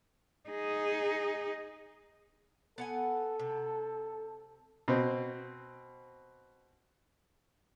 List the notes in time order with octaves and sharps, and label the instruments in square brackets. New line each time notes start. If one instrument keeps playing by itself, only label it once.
[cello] D#4 G#4
[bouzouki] B3 F#5 G#5 [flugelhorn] A4
[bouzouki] C3
[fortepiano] B2 C4